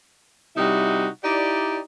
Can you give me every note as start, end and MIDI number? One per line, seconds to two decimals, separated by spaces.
0.56 1.08 48
0.56 1.08 55
0.56 1.08 63
0.56 1.08 64
0.56 1.08 66
1.24 1.79 63
1.24 1.79 64
1.24 1.79 67
1.24 1.79 74